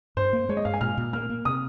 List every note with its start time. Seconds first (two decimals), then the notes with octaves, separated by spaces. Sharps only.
0.17 G2 C5
0.33 A#3
0.49 G#3 C#5
0.57 D#5
0.65 G2 F5
0.74 G#5
0.81 A#2 F6
0.98 A#2
1.13 A#3 F6
1.30 A#3
1.45 C3 D#6